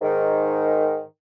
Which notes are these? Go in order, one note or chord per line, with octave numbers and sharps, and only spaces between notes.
G#2 D#3